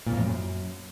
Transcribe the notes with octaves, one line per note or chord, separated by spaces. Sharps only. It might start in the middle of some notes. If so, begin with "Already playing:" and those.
A#2
F2
A2
F#2